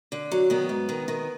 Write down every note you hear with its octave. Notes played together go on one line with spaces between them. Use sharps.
D3
F#3
D#3 B3
G#2
D#3
D#3